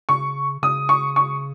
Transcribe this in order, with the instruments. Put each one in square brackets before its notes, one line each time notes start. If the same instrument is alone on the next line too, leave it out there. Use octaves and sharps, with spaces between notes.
[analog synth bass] C#3 [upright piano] C#6
[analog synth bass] C#3 [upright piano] D#6
[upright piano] C#6
C#6